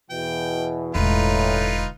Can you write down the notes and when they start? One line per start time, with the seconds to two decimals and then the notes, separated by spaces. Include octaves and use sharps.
0.10 E2 B2 E3 G5
0.95 E1 A2 D3 D#4 F4 B4